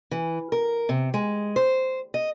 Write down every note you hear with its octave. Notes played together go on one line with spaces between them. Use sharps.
E3
A#4
C3
G#3
C5
D#5